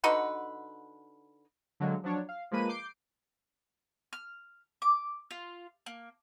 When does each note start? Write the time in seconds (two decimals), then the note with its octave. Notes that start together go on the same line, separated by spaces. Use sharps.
0.04 D3 D#4 F#4 B4
1.80 D3 F#3 G#3 A#3
2.04 F3 F#3 D4 C#5
2.29 F5
2.51 F3 G#3 A#3 B4 D#7
2.69 D6 G6 C7 D7
4.13 F6
4.82 D6
5.31 F4
5.86 A#3